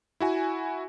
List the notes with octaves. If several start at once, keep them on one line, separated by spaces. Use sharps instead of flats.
E4 F#4 G#5